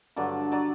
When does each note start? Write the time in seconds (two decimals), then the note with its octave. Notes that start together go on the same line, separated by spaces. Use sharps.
0.16 G2 D3 F#3 D5
0.52 F#3 D5